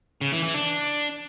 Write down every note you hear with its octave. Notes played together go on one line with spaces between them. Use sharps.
C#3
E3
E3
D4